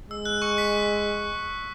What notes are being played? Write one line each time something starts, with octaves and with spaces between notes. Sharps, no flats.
G#3 E6
F#6
C#6 C#7
B6